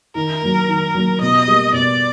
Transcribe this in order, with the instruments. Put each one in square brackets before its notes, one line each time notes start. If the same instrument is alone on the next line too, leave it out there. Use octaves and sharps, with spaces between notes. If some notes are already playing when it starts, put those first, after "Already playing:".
[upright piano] D#3 [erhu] A#4
[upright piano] F#3 A#3
D#3
F#3 A#3
[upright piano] B2 [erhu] D#5
[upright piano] G3 A#3
[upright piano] B2 [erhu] D5